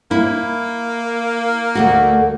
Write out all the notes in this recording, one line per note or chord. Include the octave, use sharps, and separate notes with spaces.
A#3 E4
D2 A3 F#4